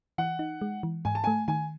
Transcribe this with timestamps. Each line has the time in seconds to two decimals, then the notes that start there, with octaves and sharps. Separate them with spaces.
0.18 E3 F#5
0.39 D#4
0.61 G#3
0.83 E3
1.05 G#2 G#5
1.15 A5
1.24 A3 G#5
1.48 D#3 G#5